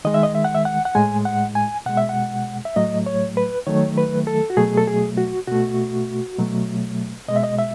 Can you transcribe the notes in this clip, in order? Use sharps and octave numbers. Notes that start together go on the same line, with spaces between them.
D#3 G#3 D#5
E5
D#5
E5
F#5
E5
F#5
F#5
A2 G#3 G#5
F#5
G#5
B2 G#3 F#5
E5
F#5
E5
A2 F#3 A3 D#5
C#5
B4
D#3 F#3 A3 C#5
B4
A4
F#4
B2 F#3 A3 G#4
A4
G#4
F#4
B2 A3 F#4
B2 F#3 A3
B2 G#3 D#5
E5
D#5
E5